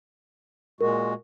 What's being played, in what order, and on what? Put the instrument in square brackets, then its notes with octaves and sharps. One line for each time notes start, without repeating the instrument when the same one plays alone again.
[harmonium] A#2 G#3 F#4 [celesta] A#4